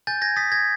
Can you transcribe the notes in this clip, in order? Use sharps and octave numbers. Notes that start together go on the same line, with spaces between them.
G#5 G6 A6
G#6 A#6
D#6 A6 B6
G#6 A#6